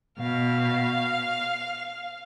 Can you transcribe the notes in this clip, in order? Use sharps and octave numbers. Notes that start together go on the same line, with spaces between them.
B2 F5